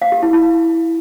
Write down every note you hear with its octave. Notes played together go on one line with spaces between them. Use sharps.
F5
G4
E4
E4